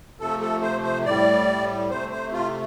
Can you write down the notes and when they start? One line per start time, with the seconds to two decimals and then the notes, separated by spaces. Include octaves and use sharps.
0.20 C3 F3 A3 A4
0.41 A4
0.62 C5
0.83 C5
1.05 A2 G3 D5
1.90 C3 A3 C5
2.11 C5
2.33 F4